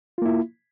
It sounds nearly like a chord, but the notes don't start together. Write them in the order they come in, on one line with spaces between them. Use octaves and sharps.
F4 A#3 E4